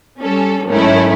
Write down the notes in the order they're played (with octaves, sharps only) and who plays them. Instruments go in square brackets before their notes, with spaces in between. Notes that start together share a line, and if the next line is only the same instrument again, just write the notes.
[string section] G3 C#4 A4
G#2 D#3 F#3 A3 C#4 E4